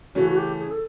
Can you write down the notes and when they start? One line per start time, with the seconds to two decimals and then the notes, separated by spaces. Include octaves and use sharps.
0.15 C#3 E3 A3 C#4 F#4
0.29 F#4
0.37 G4
0.59 G#4
0.70 A4